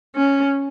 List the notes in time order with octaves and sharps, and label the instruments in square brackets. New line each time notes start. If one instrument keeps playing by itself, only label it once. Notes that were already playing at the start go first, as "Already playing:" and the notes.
[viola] C#4